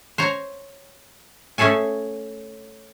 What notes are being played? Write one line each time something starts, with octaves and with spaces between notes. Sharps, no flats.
C5 C#5 A#5
A3 C#4 G#4 A4 G#5